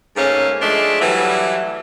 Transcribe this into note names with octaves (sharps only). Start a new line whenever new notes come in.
G#2 A3 A#3 C#4
F3 G#3 A3 D4
E3 F#3 G3 A3